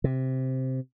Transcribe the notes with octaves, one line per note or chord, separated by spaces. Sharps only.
C3